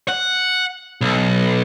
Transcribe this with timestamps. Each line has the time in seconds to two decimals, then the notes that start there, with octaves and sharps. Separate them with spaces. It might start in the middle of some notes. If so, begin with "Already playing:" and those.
0.08 F#5
1.01 B1